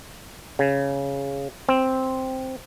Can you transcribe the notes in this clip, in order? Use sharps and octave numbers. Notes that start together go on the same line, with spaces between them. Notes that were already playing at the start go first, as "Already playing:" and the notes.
C#3
C4